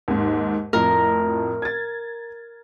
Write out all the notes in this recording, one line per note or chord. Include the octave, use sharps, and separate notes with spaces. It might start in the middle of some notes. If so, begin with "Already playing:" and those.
D#2 G#2
F2 A2 A#4
G#6 A6